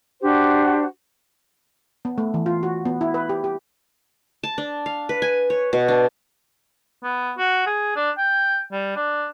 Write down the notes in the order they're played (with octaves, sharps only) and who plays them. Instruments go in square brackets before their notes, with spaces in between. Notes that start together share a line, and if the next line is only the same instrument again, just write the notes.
[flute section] D4 F#4 G4 C5
[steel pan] B3
A3
E3
F4
F#4
B3
E4
B4
G4
G4
[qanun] A5
D4
F5
B4
G#5
C#5
B2
D4
[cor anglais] B3
F#4
G#4
D4
G5
G3
D4